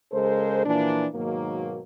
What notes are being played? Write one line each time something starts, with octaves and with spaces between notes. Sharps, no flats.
C#3 G#3 A4 A#4 C5
A#2 E3 F3 A#3 D4
G#2 B2 D#3 F#3 A#3